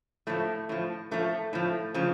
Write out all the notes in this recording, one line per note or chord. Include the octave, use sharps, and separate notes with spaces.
A2 F3 A3
A2 F3
A2 F3 A3
A2 F3
C#3 F3